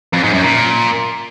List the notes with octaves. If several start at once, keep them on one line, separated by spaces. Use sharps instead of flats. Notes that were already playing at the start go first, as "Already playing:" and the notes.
F2
G#2
F#2
A#2